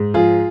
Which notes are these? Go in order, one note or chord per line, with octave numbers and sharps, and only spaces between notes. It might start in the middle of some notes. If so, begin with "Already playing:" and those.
Already playing: G#2
F3 F4 G#4